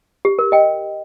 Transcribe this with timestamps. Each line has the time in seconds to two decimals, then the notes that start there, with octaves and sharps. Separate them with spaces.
0.25 G4
0.39 A#4
0.52 D#5 G5